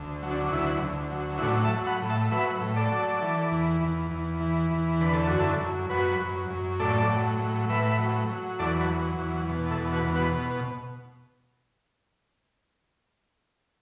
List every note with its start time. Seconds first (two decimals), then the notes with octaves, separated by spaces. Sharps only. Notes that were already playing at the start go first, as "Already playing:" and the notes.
Already playing: D2
0.23 F#3
0.31 D4
0.52 D2 E4
0.82 D2
1.12 F#3
1.38 E4
1.42 A2 D4 F#4
1.64 E5 A5
1.72 F#3
1.87 F#5 B5
2.02 A2
2.10 E5 A5
2.31 F#3 B4 E5
2.61 A2
2.76 A4 D5
2.92 F#3
3.22 E3
3.51 E2
3.81 E2
4.11 E2
4.40 E3
4.71 E2
5.01 D3 B4
5.13 A4
5.27 F#2 F#4
5.40 E4 A4
5.60 F#2
5.89 F#2 F#4 B4
6.20 F#2
6.50 F#2
6.80 A2 A4 D5
7.09 F#3
7.39 A2
7.69 A2 B4 E5
7.98 F#3
8.29 F#3
8.59 E2 A4 D5
8.81 F#4 B4
8.89 F#3
9.18 E2
9.49 B2
9.71 E4 A4
9.78 E2
9.93 F#4 B4
10.08 B2
10.15 F#4 B4